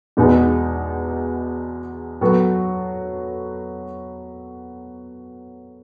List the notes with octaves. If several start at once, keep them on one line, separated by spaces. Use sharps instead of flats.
E2 B2 G#3 B3 D#4
F#3 B3 F#4 A4